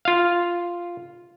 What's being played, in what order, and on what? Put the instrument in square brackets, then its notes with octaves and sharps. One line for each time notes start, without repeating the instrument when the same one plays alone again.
[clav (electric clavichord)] F4 F5